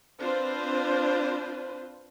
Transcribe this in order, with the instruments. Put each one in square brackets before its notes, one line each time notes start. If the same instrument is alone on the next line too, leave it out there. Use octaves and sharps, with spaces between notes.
[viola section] C4 D4 F4 B4 C5